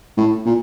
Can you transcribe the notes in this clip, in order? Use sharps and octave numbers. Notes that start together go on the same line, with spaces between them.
A2
A#2